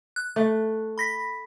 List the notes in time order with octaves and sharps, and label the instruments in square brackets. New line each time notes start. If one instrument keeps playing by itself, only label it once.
[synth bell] F#6
[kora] A3
[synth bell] B5 A#6 B6